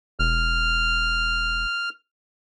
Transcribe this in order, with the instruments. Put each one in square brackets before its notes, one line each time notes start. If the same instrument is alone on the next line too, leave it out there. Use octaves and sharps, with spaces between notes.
[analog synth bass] E1 [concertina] F6